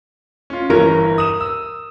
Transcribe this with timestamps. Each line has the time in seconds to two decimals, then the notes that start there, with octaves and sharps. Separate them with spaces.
0.50 C#4 F4
0.70 G1 E3 A#4 C#5
1.18 D#6 E7
1.40 E6